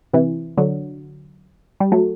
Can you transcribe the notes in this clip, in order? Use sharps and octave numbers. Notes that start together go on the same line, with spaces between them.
C3 E3
D3 F#3
G3
F#3 A3